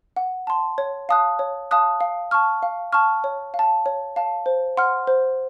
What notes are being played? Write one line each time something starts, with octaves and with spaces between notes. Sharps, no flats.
F#5
A5 C6
C#5
F5 A5 D#6 F#6
C#5
F5 A5 D#6 F#6
F5
A5 C#6 F6
F5
A5 C#6 F6
C#5
F5
A5
C#5
F5 A5
C5
F#5 C6 F6
C5